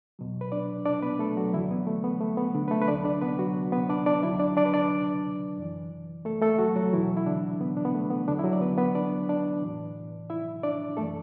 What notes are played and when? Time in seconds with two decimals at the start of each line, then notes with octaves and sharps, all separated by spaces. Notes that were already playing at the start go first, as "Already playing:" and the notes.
0.19 E2 B2 F#3
0.41 B4
0.52 D4 D5
0.85 D4 D5
1.02 B3 B4
1.19 A3 A4
1.37 F#3 F#4
1.53 D2 D3 E3 F#3 E4
1.71 B3
1.87 A3
2.04 B3
2.20 A3
2.37 B3
2.54 D3 D4
2.68 B4
2.71 A3 A4
2.82 B4
2.88 D2 D3 F#3 D4 D5
3.05 D4 D5
3.21 B3 B4
3.39 F#3 F#4
3.72 B3 B4
3.89 D4 D5
4.06 D4 D5
4.23 D2 D3 F#3 E4 E5
4.39 D4 D5
4.57 D4 D5
4.65 B4
4.74 D4 D5
5.58 F#2 E3
6.25 A3 A4
6.42 A3 A4
6.58 F#3 F#4
6.76 F#3 F#4
6.93 E2 B2 E3 F#3 E4
7.17 E4
7.26 D3 D4
7.61 B3
7.77 D4
7.85 B3
7.94 A3
8.11 B3
8.28 E2 D3 F#3 D4
8.39 E4
8.44 F#3 F#4
8.53 D5
8.61 B3 B4
8.78 B3 B4
8.95 D4 D5
9.29 D4 D5
9.62 A2 E3
10.30 E4 E5
10.63 D4 D5
10.97 F#2 A3 A4
11.01 E3